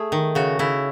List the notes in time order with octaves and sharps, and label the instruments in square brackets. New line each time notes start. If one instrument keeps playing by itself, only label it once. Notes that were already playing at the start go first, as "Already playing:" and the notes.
Already playing: [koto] A3 G#4
D#3
C#3 F#4
C#3 E4